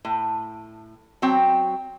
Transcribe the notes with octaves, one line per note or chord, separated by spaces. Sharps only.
A2
F#3 C4 G5